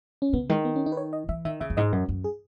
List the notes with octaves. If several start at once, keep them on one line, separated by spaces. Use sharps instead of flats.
C#4
C#3 B3
D#3 G#3
B3
C#4
D#4
B4
C#5
D#5
E3 E5
D#3 E5
C#3 E5
F#2
G#2 D#5
F#2
F#2
G#4